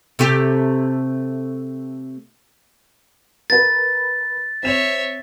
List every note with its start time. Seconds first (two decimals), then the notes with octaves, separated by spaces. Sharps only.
0.19 C3 A3 G4
3.50 A#4 B4 A6
4.63 C4 C#5 E5 E7 F7